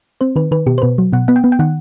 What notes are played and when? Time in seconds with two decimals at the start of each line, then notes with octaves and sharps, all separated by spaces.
0.21 C4 C5
0.36 D#3 B4
0.51 D#3 B4
0.66 B2 G4
0.78 C5
0.82 B2 B4
0.98 F#3
1.13 B2 F#5
1.28 B3 F#5
1.36 G5
1.44 B3
1.52 G5
1.59 D#3 F#5